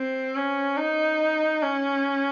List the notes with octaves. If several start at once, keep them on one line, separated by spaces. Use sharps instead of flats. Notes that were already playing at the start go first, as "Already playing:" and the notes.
Already playing: C4
C#4
D#4
C#4